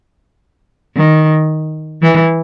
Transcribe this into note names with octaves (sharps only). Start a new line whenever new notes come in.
D#3
E3